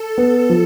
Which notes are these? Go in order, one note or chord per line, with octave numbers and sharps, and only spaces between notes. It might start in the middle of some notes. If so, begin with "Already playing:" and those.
Already playing: A4
B3
F3